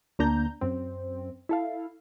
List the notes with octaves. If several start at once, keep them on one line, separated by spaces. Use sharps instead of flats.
D2 A#3 D4 A#5 G6
F#2 C4
E4 A4 F5